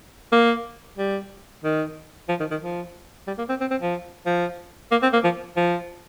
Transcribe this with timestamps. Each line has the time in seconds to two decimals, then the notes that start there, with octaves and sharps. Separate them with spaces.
0.32 A#3
0.98 G3
1.64 D#3
2.29 F3
2.40 D#3
2.51 D#3
2.62 F3
3.27 G3
3.38 A#3
3.49 C4
3.61 C4
3.71 C4
3.82 F3
4.26 F3
4.91 A#3
5.02 C4
5.13 A#3
5.24 F3
5.57 F3